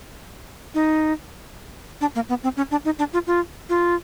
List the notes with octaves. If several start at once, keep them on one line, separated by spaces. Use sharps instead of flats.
D#4
D4
A#3
B3
C4
C#4
D4
D#4
D4
F4
F4
F4